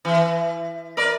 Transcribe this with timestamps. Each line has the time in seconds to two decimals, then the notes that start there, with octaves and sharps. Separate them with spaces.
0.05 E3
0.97 A#4 B4 D5